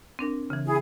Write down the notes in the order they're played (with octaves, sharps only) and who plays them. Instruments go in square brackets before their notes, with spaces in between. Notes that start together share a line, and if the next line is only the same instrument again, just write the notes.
[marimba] C4 D4 A#4
C#3 E3
[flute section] E4 G#4